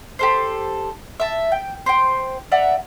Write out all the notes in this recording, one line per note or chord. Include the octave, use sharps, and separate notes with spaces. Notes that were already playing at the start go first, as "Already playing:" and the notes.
G4 A4 C5
E5 A5
G5
C5 G5
D5 E5 F#5 A#5